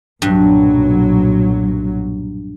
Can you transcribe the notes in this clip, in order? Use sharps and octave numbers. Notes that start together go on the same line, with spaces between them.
B1 G2 A#2 F#3